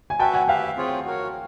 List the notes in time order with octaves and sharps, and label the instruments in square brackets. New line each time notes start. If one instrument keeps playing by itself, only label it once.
[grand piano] G#5
[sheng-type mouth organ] F#4 B4 E5 [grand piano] G5 A5
[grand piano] F#5 G#5
[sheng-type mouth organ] G4 B4 E5 [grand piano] F5 G5
[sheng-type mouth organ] C4 F4 G#4 C#5
F#4 A#4 C#5